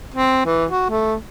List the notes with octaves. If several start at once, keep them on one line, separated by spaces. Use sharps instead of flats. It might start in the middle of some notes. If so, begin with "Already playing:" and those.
C4
E3
F#4
A3